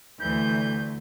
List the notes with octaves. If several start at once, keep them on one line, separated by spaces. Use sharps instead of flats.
D2 E3 G6